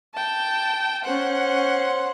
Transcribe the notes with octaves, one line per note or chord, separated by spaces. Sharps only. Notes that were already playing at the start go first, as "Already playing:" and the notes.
G5 A5
C#4 C5 F#5